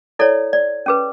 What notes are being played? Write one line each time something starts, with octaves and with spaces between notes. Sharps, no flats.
E4 A4 C#5 D5
D5
C#4 G#4 B4